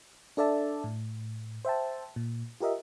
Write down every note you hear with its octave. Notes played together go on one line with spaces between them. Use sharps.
D4 A4 D5 E5 A5
A2
C5 E5 G5 A5
A#2
F4 G4 A#4 D#5 E5